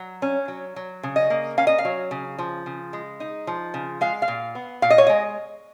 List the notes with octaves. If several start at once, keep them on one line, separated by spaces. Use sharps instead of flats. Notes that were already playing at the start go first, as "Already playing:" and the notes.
Already playing: F#3
C#4
F#3
F#3
C#3
D#5
A#3
C#4 F5
D#5
F5
F#3
C#3
F3
C#3
G#3
D#4
F3
C#3
G#3 F5
F5
A#2
B3
A#2 F5
D#5
C#5
G#3 D#5